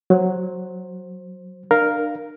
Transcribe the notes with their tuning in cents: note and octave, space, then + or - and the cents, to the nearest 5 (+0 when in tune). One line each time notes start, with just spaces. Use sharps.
F#3 +0 C5 +15
D4 +40 A#4 +0 F5 +0